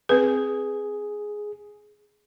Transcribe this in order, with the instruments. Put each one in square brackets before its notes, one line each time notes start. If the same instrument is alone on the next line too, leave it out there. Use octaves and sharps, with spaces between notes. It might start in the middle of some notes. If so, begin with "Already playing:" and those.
[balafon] C4 B4 [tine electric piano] G#4